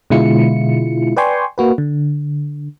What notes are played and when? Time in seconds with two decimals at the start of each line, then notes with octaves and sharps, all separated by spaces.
0.10 B2 D3 G#3 E4 F4 C#7
1.17 B4 D5 G5 G#5 C6 C#6
1.58 A#3 F#4 B4
1.78 D3